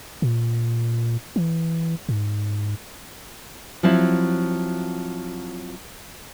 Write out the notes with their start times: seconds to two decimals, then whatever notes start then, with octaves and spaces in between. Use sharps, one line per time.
0.22 A#2
1.36 E3
2.09 G#2
3.83 F3 F#3 C4 E4